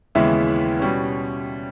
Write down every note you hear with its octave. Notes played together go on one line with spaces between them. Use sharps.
D#2 C#3 E3 G#3 B3 E5
B2 G3 C#4